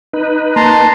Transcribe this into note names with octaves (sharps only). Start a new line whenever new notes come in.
D#4 B4
A#3 A5 A#5 C6